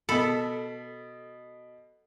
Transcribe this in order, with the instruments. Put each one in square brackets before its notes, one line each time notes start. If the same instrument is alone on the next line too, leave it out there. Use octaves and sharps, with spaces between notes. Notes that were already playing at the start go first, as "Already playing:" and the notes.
[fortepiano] B2 B5 [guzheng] A4